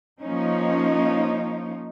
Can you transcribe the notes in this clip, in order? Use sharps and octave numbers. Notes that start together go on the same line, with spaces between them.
F3 A#3 C#4 D#4